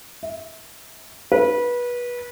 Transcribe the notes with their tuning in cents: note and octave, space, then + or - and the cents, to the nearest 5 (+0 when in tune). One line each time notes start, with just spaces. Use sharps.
E5 -35
B4 -25